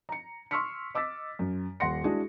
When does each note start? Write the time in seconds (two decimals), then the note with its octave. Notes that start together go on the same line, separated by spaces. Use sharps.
0.09 A#5 C#7
0.51 C6 C#6 E6 F6 B6 C#7
0.94 D#5 D6 E6 A6 B6
1.39 F#2
1.80 D#1 F#5 C6 A#6 C#7
2.04 G#3 D4 E4 F#4 G#4